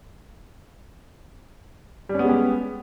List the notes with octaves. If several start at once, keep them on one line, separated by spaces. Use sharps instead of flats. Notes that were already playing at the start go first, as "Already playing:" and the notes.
G3 G#3 B3 C#4 G4